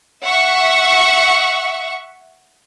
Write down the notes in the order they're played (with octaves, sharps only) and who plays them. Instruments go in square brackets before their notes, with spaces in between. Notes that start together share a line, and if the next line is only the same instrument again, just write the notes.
[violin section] E5 F#5 C#6